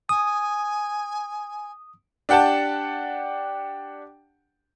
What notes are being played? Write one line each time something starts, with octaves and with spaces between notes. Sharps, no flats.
G#5 D#6
D4 G4 F#5 G5 A5